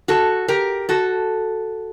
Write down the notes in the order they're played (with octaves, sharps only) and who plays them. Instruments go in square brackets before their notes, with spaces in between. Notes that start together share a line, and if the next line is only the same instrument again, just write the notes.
[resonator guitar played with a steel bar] F#4 A4
G4 A#4
F#4 A4